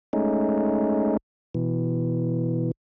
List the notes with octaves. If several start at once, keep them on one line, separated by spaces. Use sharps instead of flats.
G#3 A3 C#4 D#4
B2 E3